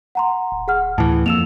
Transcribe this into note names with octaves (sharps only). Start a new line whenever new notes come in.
F#5 A#5 C6
D1
G#4 F#5 F6
D2 A2 E3 A5
F2 A#3 E6 E7 F7